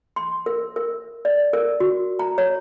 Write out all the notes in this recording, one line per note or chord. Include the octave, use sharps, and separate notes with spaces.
C6
A#4
A#4
D5
A#4
F#4
A#5
C#5